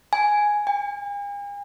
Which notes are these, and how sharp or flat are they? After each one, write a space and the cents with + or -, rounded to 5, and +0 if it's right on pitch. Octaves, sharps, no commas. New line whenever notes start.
G#5 +0
G#5 -45